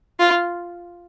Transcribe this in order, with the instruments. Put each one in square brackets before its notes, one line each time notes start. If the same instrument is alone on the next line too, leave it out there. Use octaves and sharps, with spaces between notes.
[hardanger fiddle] F4